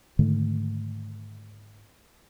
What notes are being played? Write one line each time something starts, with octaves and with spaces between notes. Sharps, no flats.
G#2 D3 D#3 A3